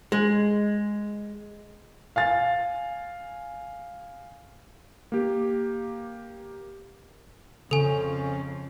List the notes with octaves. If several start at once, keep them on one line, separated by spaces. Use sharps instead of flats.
G#3
F5 G#5 A6
A#3 G4
F2 C#3 C#4 A4 G#5